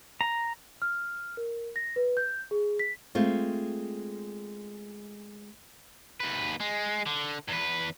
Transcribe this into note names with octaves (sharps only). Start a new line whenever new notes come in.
A#5
F6
A#4
A#6
B4
G6
G#4
B6
G#3 A3 C4 F4
D#2 B4
G#3
D3
E2 B4